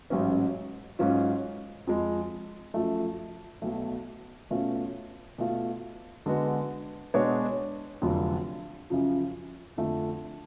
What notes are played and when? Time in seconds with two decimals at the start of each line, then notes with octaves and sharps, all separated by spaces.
0.10 A1 G#2 F#3 C#4
0.99 G#2 F#3 C#4 F4
1.87 F2 F3 G#3
2.74 F#2 F3 A3
3.62 B1 B2 A3
4.51 B2 A3 C#4 F4
5.38 B2 A3 F4
6.26 D3 G#3 B3 F#4
7.14 B2 G#3 D4 F#4 C#5
8.01 F1 F2 D3 F#3
8.90 F#2 C#3 F3
9.77 F2 D3 F3 A3